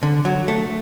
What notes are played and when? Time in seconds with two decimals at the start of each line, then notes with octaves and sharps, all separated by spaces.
0.03 D3
0.25 F#3
0.48 A3